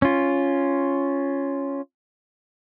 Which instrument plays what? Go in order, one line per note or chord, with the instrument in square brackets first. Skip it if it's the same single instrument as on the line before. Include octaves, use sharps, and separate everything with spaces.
[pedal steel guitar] C#4 F4